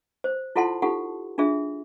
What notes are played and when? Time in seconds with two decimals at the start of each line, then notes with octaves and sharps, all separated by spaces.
0.24 C5
0.56 E4 F4 A4 F#5 A5 C6
0.82 D#4 F4 G4 A4 F#5
1.38 D4 F4 G#4 E5